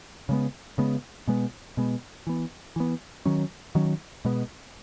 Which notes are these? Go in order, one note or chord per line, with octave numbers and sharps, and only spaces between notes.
C#3 G#3 B3
C#3 G#3 B3
B2 G#3 B3
B2 G#3 B3
E3 B3
E3 B3
D#3 F#3 C#4
D#3 F#3 C#4
B2 G#3 B3